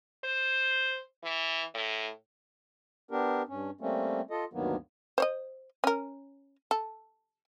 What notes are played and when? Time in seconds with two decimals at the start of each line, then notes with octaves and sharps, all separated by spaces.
0.24 C5
1.23 E3
1.74 A2
3.11 B3 D4 G4 A#4
3.48 G2 C#4
3.81 G3 A3 A#3 C4 C#4
4.30 F4 A4 D#5
4.53 D2 G2 D#3 F#3 A#3 B3
5.18 C5 C#5 D#5
5.84 C#4 A#4
6.71 A4